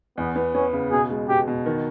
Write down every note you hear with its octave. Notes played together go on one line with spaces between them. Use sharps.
E2 B3
B3
B3 C#4
C#3
B2 G#4
G#3
B2 G4
B2
D#3